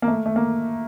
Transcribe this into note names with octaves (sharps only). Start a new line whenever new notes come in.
A#3
A3
A3
A#3